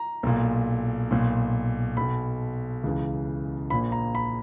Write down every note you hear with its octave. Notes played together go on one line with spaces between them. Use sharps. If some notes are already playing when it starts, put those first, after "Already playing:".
Already playing: A#5
B1 A#2
B1 A#2
B1 B2 B5
C#2 C#3 E3
A#1 A#2 B5
A#5
B5